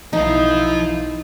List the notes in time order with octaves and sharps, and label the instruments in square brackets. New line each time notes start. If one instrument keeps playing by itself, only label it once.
[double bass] B1 [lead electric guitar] F3 F5 [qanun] D#4 [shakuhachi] E4